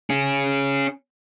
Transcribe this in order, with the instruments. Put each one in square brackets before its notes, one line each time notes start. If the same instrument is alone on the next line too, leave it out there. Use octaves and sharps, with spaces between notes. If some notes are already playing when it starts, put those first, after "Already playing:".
[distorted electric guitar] C#4 G#4